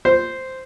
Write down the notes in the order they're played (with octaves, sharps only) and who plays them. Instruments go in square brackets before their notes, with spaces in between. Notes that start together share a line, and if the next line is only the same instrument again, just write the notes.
[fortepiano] C5